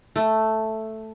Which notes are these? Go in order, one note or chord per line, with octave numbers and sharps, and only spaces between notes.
A3